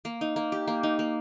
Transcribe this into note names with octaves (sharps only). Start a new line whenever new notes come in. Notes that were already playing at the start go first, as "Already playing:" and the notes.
A#3
D#4
A#3
G4
A#3
D#4
A#3